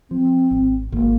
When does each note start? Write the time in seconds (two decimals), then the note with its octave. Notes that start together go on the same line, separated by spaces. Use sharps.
0.10 F3 C4
0.51 G#1
0.92 G#1 A#3